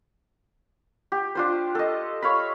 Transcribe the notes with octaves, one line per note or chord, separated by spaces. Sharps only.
G4
D4 F4 C5
A4 D#5
C#5 F5 B5